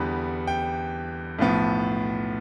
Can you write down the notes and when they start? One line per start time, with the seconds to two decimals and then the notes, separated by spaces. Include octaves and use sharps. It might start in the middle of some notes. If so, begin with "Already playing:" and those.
Already playing: E2 D3 G3 B3
0.47 G5
1.39 B1 A2 F3 B3